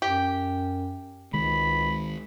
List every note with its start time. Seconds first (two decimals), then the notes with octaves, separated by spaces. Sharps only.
0.02 F#2 G4
1.34 C#2 D#3 G#3 B5